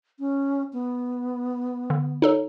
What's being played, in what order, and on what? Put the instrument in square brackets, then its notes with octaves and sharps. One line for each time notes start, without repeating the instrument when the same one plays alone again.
[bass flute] C#4
B3
[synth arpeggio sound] D3
D#4 A4 C#5